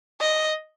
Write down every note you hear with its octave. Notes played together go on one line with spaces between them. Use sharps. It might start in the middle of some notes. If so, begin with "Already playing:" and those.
D#5